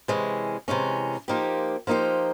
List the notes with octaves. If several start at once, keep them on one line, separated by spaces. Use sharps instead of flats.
C3 E3 G#3 C#4
C3 E3 G#3 C#4
F3 A#3 D#4 G4 C5
F3 A#3 D#4 G4 C5